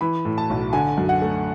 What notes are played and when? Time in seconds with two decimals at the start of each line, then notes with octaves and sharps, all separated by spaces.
0.01 E3 B5
0.25 A2
0.38 A5
0.50 B1
0.73 D3 G#5
0.97 F#2
1.09 F#5
1.22 A3